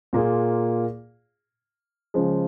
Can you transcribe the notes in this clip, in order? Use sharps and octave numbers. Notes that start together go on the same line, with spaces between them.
A#2 A#3 F4 G#4
C#3 F3 G#3